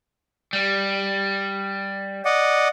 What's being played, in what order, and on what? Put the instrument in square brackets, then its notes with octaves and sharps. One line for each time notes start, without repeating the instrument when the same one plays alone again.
[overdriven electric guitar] G3
[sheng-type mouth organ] D5 D#5 F#5